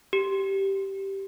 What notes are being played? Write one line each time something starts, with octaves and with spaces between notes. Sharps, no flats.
G4